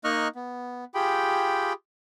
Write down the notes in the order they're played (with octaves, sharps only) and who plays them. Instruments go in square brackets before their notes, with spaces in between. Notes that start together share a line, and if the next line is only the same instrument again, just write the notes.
[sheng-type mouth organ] A#3 D#4 D#5 C#6 F6 F#6
B3
F4 G4 G#4 G5 B5